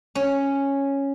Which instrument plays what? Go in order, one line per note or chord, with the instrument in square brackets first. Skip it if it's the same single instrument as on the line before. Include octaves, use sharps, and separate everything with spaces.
[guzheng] C#4